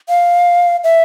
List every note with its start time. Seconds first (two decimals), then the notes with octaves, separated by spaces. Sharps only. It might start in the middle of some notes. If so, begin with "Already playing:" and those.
0.09 F5
0.84 E5